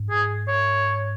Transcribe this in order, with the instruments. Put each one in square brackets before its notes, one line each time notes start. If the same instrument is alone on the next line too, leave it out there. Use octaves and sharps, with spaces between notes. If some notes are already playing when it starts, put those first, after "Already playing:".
Already playing: [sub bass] G#2
[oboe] G#4
C#5